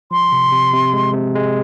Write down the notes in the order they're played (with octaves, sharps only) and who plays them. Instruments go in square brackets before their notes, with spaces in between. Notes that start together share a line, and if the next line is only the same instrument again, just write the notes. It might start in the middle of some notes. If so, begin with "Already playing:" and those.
[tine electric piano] F3 [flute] C6
[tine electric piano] C3
C3
C3
G#3
C3
G#3